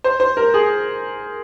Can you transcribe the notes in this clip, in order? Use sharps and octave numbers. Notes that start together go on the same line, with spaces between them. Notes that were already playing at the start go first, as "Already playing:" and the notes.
C5
C5
A#4
G#4